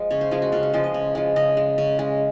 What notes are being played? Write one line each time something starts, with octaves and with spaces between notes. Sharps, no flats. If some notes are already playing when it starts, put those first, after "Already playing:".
Already playing: F3 G#3
C#3 C#5
C5
F3 G#3 G#4
F#4
C#3 F4
F#4
F3 G#3 C5
D#5
C#3
F3 G#3
C#3 D#5
G#3
C#3
G#3